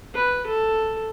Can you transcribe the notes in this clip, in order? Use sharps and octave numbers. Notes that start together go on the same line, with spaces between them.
B4
A4